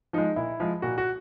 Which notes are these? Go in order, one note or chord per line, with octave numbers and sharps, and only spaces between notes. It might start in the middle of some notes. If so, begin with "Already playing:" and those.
F3 G#3 D#4
A#2 E4
F3 G#3
A#2 F#4
F#4